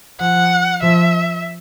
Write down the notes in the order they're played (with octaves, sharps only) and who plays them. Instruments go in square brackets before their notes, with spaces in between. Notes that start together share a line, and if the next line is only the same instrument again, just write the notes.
[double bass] F3 [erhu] F#5
[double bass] F3 [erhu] E5